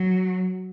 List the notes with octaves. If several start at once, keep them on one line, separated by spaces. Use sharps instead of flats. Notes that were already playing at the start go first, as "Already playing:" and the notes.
Already playing: F#3